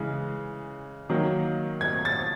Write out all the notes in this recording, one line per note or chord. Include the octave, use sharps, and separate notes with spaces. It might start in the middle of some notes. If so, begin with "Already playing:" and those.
Already playing: C#3 E3 G#3
D#3 F#3 A#3
G#6
A6